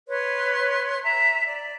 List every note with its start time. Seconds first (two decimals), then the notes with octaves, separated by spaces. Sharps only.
0.08 B4 C#5 C6
1.03 E5 A#5
1.46 D5